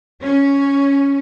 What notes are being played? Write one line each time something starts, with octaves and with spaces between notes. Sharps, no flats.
C#4